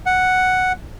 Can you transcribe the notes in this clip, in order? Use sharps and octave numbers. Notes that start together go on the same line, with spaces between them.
F#5